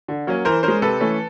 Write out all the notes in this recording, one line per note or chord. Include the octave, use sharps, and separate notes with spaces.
D3
F#3 A#3 C#4
E3 A#4 C5
G#3 C#4 A#4 C5
C3 A4 B4
E3 A3 C#4